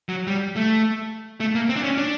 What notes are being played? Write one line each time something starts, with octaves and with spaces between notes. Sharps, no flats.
F#3
G3
A3
A3
A#3
C4
D4
C#4
D4